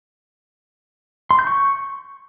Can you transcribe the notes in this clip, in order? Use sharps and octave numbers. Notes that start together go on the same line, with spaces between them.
C6
G6
C#6